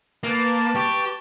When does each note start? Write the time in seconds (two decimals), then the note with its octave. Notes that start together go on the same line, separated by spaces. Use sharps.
0.23 A#3 B4 A5
0.76 G4 C#6